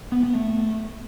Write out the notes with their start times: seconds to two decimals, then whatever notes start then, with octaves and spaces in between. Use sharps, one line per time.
0.12 B3
0.23 B3
0.35 A3